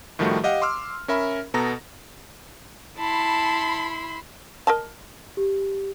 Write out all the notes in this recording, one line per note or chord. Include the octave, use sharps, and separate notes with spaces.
A2 D#3 F3 G3 A3 F#4
G4 D#5 F5 F#5
C6 D6 E6 F6
C#4 A#4 E5 B5
B2 B3 A4 A5 A#5 A#6
E4 A5 B5 C6
A#4 D#5 A5
G4